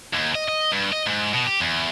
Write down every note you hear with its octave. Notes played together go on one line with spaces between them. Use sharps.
D#2
D#5
D#5
G2
D#5
G#2
B2
G4
E2